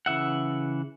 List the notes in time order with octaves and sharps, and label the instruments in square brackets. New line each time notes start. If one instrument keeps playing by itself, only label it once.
[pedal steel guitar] C#3 E3 E5 F#5